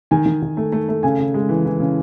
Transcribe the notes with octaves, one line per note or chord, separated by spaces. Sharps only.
D#3 G#5
D#3
D#3
A3
A3
A3
C#3 G#5
C#3
G#3
E3
E3
C#3